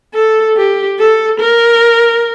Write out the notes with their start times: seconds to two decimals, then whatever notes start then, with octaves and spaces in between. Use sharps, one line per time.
0.15 A4
0.57 G4
0.99 A4
1.40 A#4